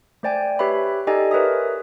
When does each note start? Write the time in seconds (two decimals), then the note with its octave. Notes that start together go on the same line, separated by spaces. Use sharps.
0.23 A3 C5 D5 G5 G#5
0.59 G4 B4 C#5 E5 B5
1.07 D#4 G4 A4 D5 D#5 G#5
1.31 A#4 B4 C#5 E5 D#6